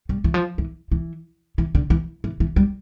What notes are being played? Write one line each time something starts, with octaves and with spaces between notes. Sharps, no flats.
G3
E3
F3
E3
E3
E3
D3
E3
E3
E3
G3